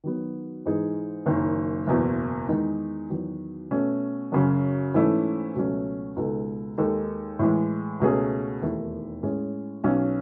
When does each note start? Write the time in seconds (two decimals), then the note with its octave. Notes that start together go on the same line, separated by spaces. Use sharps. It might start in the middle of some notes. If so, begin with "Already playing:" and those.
0.04 D#3 F#3 B3
0.66 G#2 E3 G#3 D#4 G#4
1.26 F#1 F#2 D#3
1.87 F#1 E2 B2
2.48 E2 D#3 G#3 D#4
3.10 E2 D#3 F#3
3.71 B2 A3 C#4
4.32 F#2 C#3 F#3 C#4
4.94 G#2 E3 A3 C#4 E4
5.55 C#2 B2 F#3 A3 C#4
6.16 C#2 B2 G#3 D#4 A4
6.78 D#2 D#3 G#3 D#4 A4
7.39 A2 E3 G#3
8.00 C#2 B2 A3 C#4 G#4
8.62 E1 D#2 D#3 A3 E4
9.23 A2 G#3 C#4 G#4
9.84 B1 B2 F#3 C#4